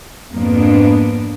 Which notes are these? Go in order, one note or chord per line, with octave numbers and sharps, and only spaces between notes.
F2 G#2 A#3 B3 D4